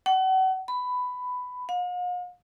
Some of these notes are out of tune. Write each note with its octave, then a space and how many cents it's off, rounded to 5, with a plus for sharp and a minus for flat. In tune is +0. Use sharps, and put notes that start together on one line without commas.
F#5 +35
B5 +10
F5 +45